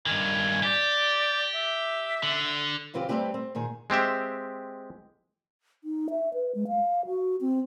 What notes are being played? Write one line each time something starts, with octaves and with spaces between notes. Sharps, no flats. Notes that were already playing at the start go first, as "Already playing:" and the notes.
G2 D#3 G#5
G4 D5
E5
D3
C#3 E3 C4 F4 G4
G3 A3 C4 D#4 G4 B4
C4
A#2 D#3 G#4
G#3 C4 G4 E5
D#4
E5
B4
G#3
F5
F#4
C4